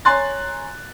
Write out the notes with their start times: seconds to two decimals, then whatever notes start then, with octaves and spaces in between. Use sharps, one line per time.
0.05 C#5 G#5 A#5 C6 F#6 A6